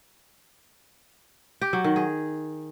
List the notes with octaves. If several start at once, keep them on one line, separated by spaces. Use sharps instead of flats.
G4
F#3
D#3
G#4